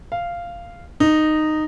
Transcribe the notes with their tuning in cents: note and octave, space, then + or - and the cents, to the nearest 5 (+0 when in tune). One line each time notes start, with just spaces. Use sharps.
F5 -10
D#4 -10